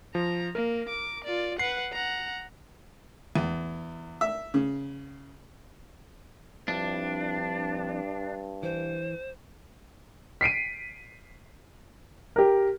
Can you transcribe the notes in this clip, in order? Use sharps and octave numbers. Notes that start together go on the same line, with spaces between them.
F3 A#5
A#3 A#4
D6
F4 D5
B4 F#5 C7
F#5 A#5
E2
E5
C#3
G2 F3 C4 D4 E4
E3 C5
B6 C7 D7 D#7
G4 A#4